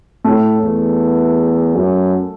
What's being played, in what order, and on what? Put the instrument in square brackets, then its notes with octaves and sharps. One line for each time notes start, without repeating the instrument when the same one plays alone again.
[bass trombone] A2 [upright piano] A3
[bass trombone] E2
F#2